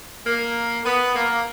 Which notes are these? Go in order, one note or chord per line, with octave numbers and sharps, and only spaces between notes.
A#3
B3
A#3